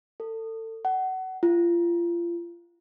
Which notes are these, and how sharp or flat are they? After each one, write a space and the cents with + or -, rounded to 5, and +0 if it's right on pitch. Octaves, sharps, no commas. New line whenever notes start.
A4 +30
F#5 +25
F4 -30